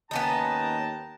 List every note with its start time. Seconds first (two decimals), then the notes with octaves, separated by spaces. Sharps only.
0.11 D#2 B3 C#4 D#4 G5 A5 A#5